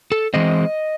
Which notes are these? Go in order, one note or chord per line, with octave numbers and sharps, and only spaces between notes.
A4
E3 G#3 C4 D#5